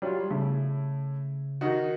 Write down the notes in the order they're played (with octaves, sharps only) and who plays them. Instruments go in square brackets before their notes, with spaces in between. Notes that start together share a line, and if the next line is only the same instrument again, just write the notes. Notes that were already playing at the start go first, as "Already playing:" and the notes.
[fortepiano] F#3 F4 [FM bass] G3
[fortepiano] A2 [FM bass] C#3
[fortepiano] D#3 D#4 F#4